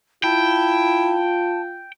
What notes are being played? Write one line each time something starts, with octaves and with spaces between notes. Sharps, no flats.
E4 F4 G5 A5